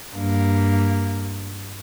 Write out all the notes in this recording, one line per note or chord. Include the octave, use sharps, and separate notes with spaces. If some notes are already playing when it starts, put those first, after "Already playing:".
G2 A#3